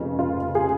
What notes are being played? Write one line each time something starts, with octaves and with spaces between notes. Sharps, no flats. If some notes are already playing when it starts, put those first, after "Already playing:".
Already playing: F1 F2 C#3
F4
G#4